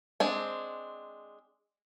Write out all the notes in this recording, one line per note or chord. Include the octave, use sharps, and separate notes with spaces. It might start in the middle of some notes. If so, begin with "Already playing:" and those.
G#3 C4 D4